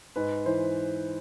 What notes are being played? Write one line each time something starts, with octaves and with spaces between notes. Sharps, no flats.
G#2 B4
E3 C5